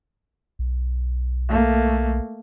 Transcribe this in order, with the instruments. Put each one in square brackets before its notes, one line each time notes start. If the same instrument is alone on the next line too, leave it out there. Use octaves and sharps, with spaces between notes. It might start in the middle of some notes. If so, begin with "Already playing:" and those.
[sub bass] B1
[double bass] A3 A#3